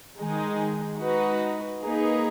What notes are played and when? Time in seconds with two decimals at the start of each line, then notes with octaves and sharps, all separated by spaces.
0.18 D#3 G#3 D#4 G#4
0.98 G#3 D#4 F#4 B4
1.80 A#3 D#4 G#4 B4